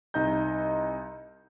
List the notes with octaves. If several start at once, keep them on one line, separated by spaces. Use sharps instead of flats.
C2 D#4 D#5 A#5 G6